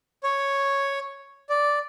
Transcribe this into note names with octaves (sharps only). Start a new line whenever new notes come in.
C#5
D5